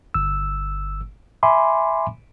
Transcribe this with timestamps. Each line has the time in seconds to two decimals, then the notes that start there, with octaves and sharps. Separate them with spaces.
0.14 G1 E6
1.43 E5 G#5 B5 C6 D6